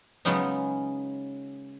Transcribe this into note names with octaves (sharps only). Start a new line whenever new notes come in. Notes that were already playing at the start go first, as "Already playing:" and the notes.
C#3 F#3 G#3 B3 C#4 D#4